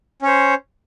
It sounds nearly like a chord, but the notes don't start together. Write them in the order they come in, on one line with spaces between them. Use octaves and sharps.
C#4 C#5 C5